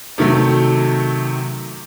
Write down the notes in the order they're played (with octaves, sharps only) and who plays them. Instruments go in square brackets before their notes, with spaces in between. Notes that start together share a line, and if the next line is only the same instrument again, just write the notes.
[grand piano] C3 D#3 F#3 A3